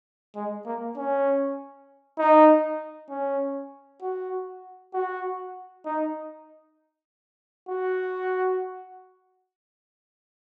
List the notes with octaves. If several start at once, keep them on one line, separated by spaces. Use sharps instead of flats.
G#3
A#3
C#4
D#4
C#4
F#4
F#4
D#4
F#4